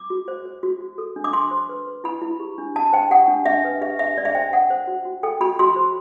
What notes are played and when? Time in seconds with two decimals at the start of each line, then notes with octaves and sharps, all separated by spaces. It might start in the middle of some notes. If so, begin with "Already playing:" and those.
Already playing: D6
0.10 F#4
0.28 C5
0.46 C5
0.63 F#4
0.81 F#4
0.98 A4
1.16 D4
1.24 D6
1.33 D4 C6
1.51 C5
1.69 B4
1.87 B4
2.04 E4 B5
2.22 E4
2.40 G4
2.58 D4
2.75 D4 A5
2.93 C5 G5
3.10 G4 F#5
3.28 D4
3.46 D4 E5
3.64 B4
3.81 G4 E5
3.99 D4 E5
4.18 D4 D5
4.25 E5
4.35 C5 G5
4.52 C5 F#5
4.70 C5
4.87 F#4
5.05 F#4
5.23 A4 G5
5.41 F#4 B5
5.59 F#4 C6
5.76 C5